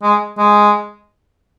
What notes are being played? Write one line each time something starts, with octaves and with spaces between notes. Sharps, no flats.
G#3
G#3